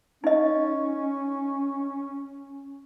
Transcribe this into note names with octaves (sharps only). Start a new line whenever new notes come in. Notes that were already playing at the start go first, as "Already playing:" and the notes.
C#4 D#4 D#5